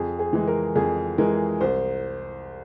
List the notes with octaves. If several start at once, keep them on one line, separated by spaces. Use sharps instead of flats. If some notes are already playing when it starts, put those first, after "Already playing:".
Already playing: F2 G#4
G#4
E3 G#3
A#4
F2 G#4
E3 G#3 A#4
C2 C5